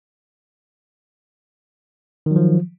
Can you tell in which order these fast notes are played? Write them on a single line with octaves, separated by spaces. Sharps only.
D#3 F#3 F3